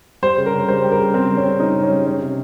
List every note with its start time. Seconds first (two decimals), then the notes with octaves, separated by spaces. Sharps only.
0.22 G3 C5
0.38 C#3
0.46 A#4
0.53 C#3
0.68 G3 C5
0.84 G3
0.92 A#4
0.99 C#3
1.14 C#3 C4
1.30 G3
1.37 C#4
1.45 G3
1.60 C#3 D#4
1.75 C#3
1.83 C#4
1.90 G3
2.06 G3 C#4
2.21 C3